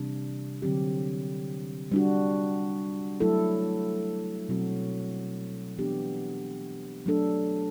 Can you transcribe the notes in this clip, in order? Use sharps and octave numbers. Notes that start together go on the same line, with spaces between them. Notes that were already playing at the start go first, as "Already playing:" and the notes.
Already playing: C3 E3 G3 D4
D3 F#3 C4 G4
G3 D4 F#4
F#3 A3 E4 A4
B2 F#3 C4 F#4
E3 B3 D4 G4
F#3 A3 D4 A4